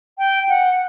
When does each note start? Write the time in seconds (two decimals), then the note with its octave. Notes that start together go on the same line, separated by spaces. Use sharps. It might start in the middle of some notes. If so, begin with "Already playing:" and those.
0.18 G5
0.49 F#5